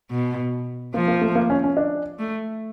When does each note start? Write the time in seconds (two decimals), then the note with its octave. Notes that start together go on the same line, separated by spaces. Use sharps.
0.11 B2
0.94 F3 A#3
1.08 A#3
1.21 A3
1.35 A#3
1.50 C#4
1.64 C#4
1.77 D4
2.19 A3